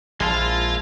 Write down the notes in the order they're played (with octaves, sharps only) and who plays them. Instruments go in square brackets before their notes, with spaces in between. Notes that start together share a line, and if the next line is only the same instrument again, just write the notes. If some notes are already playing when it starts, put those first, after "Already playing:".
[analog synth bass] A#1 [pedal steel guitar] G#3 E4 A5 [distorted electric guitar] F5 C6